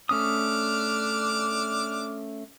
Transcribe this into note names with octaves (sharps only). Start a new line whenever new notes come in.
A3 C#4 D4 D6 D#6 F6